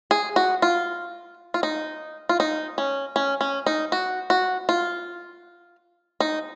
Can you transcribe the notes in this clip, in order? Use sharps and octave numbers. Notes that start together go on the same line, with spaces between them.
G#4
F#4
F4
F4
D#4
F4
D#4
C#4
C#4
C#4
D#4
F#4
F#4
F4
D#4